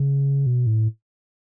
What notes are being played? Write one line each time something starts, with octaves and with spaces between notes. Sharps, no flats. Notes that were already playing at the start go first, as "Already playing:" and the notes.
Already playing: C#3
B2
A2